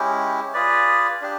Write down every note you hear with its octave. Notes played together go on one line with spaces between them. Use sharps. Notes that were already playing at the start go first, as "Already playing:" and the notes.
Already playing: G#3 C#4 E4 G4
F4 G#4 B4 D5
D4 G4